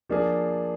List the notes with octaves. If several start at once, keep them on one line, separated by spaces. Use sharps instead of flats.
F3 A#3 D4 G#4